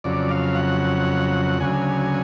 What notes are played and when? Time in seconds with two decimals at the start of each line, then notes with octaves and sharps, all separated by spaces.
0.04 F2 C#3 F#3 D5
0.31 F5
0.56 F#5
1.60 D2 C#3 F#3 G#5